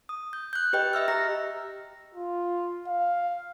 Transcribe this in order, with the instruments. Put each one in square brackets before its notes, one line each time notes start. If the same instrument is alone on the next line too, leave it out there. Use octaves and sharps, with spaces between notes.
[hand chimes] D#6
G6
F#6 G6
G4 B4 D#5 G5
D#5 E5 E6 F6
G4 A#5 A#6
[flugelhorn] F4
F5